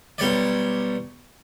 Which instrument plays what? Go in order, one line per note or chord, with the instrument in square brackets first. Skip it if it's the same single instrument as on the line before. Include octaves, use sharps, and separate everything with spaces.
[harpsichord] B1 G3 C#5 D5